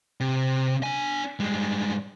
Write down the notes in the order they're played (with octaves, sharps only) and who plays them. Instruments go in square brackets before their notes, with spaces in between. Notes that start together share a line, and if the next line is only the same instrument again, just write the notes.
[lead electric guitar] C3
D4 G#5
G2 G#3